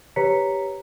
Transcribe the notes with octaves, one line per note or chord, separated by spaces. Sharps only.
G4 B4 C#5 A#5 B6 C#7